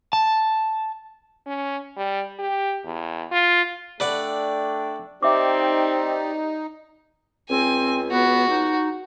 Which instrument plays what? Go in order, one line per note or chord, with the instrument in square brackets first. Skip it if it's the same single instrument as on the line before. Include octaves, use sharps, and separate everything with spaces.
[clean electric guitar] A5
[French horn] C#4
G3
G4
E2
F4
[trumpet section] A3 D4 G5 [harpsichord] B4 D5 F#5
[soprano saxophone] C4 [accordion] D#4 [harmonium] G4 D5 [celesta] E5 D6
[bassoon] C#2 [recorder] C4 [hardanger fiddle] G#5
[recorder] B3 [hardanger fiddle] F#4
[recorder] D#4